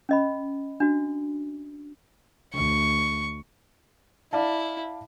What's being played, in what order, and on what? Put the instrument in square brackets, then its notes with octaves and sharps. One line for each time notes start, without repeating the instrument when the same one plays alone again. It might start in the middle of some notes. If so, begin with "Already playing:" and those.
[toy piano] C#4 D#5 B5
D4 F#4
[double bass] D2 [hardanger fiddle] C#6
[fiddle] E4 [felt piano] D5 F5 A5